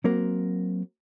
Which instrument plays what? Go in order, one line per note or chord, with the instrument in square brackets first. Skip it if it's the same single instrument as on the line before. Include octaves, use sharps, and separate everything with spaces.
[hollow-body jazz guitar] F#3 A#3 C4 A#4 F#5